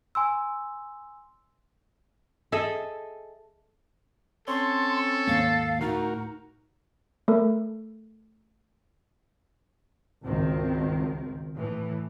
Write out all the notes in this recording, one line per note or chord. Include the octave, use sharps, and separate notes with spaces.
G#5 C6 E6
G#4 A4 D#5 E5
C4 C#4 A4 C#5 C6
D#2 G#2 A#3 F5
D2 A2 D#4 F#4 A#4
A3 A4 A#4
G#1 C#2 D#3 C4
A2 E3